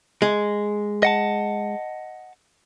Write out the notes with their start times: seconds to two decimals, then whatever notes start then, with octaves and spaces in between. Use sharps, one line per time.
0.22 G#3
1.03 D#5 F#5 A5